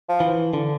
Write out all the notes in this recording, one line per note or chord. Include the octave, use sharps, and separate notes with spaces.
F3
E3
D3